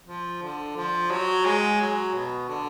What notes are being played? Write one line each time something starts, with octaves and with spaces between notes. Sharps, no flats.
F3
D3
F3
F#3
G#3
F#3
B2
D3